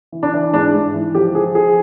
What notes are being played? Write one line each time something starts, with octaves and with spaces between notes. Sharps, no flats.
E3
D4
E3
G#2 D4
G#2
E3
F3 G4
F3 G#4
F3 G#4